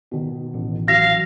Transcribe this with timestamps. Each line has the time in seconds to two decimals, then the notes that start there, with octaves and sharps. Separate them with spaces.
0.11 B2 D#3
0.54 A1
0.88 F#3 F5 A#6